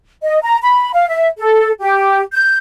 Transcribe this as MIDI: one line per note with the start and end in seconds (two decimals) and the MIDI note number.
0.23 0.39 75
0.43 0.57 82
0.62 0.91 83
0.94 1.08 77
1.09 1.27 76
1.38 1.71 69
1.80 2.22 67
2.33 2.58 91